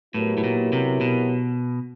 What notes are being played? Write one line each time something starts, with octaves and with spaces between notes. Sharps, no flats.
A2 F#3 B3 E4 G4 A#4
A2
A#2
C3
B2